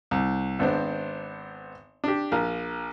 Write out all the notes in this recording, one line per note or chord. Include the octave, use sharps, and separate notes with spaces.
C2
G#1 B3 D4 C5
D4 G4
A#1 A#4 F5